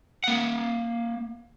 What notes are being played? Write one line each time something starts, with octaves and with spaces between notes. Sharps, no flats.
A#3 F#5